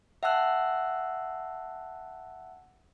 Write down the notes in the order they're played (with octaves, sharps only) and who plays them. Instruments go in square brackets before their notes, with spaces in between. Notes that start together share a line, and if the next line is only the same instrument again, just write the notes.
[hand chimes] E5 F#5 G5 A5 E6 F#6